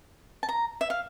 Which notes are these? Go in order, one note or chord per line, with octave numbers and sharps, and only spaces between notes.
A5
A#5
E5
F5